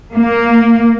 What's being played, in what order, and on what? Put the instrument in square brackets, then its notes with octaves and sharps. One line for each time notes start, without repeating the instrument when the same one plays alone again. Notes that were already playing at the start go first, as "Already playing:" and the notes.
[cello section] A#3